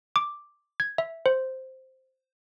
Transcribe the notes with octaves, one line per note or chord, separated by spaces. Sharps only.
D6
G#6
E5
C5